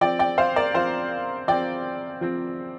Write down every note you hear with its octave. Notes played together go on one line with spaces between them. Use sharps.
F3 C4 D5 G5
D5 G5
C5 F5
A#4 D5
F3 C4 C5 F5
F3 C4 D5 G5
F3 C4